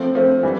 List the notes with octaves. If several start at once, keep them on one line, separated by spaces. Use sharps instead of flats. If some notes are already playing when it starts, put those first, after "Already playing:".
Already playing: F3 A3 C4
F3 A3 C4
E3 G3